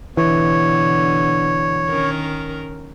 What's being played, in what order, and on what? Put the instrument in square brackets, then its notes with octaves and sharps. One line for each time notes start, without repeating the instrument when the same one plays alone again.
[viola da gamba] B2 D3 [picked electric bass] E3 [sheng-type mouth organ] C#5
[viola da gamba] D#3 C#4 A#4